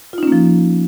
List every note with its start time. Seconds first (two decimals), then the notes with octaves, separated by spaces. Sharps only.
0.13 F4
0.18 D#4
0.23 C#4
0.27 A#3
0.32 F3